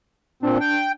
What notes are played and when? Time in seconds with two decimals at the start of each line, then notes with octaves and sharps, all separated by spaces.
0.43 A#2 C4 D4
0.61 G5